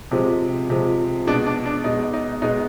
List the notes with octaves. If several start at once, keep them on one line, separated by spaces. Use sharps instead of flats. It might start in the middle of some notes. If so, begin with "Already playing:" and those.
C3 F3 G#3
C3 F3 G#3
B2 G#3 D4
D4
D4
B2 G#3 D#4
D#4
B2 G#3 D#4